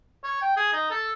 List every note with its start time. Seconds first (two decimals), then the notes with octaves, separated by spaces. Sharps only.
0.24 C#5
0.42 G5
0.57 G#4
0.73 D#4
0.91 A4